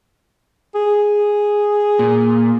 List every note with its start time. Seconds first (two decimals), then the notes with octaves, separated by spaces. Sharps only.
0.75 G#4
1.99 A#2